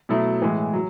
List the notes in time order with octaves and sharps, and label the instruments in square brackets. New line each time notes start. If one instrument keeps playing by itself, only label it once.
[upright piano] B2 F#3 A3 E4
A2 E3 G#3
F#3